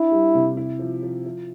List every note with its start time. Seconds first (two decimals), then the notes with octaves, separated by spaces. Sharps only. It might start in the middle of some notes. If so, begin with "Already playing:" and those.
Already playing: D4 E4
0.12 G3
0.35 C3
0.57 E4
0.79 F3
1.03 F3
1.26 F3